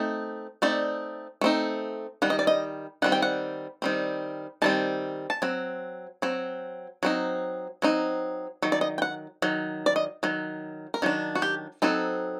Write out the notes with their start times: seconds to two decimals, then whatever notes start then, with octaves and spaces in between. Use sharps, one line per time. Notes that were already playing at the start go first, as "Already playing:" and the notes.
Already playing: A3 C4 D#4
0.62 A3 C4 D#4 D5
1.41 A3 C4 D#4
2.22 D#3 G3 F#5
2.30 D#5
2.39 D5
2.47 D#5
3.02 D#3 G3 C4 F#5
3.12 G5
3.22 F#5
3.82 D#3 G3 C4
4.62 D#3 G3 C4 A5
5.30 A5
5.42 F#3 C4
6.22 F#3 C4
7.03 F#3 C4 D#4
7.82 F#3 C4 D#4
8.62 D#3 F#3
8.72 D5
8.81 D#5
8.98 G5
9.02 F#5
9.42 D#3 F#3
9.86 D5
9.96 D#5
10.23 D#3 F#3
10.94 A#4
11.02 D#3 F#3 D4
11.35 F#4
11.42 G4
11.82 F#3 C4 D#4 A4